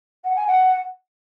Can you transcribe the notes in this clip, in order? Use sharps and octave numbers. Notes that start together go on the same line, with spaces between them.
F#5
G#5
F#5